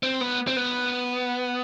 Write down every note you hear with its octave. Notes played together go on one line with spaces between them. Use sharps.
C4
B3
C4
B3